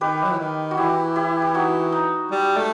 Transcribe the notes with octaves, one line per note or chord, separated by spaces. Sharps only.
D#3 G4 B4
F#3
E3
D#3
F#4
E3 E4 G4
E4 G4
G4
D#4 F#4
D#4
G3
A3